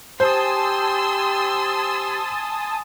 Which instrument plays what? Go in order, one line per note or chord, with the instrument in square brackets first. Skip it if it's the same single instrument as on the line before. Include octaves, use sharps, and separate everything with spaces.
[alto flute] G4 [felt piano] C5 [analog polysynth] G#5 A5 D#6 [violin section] C6 E6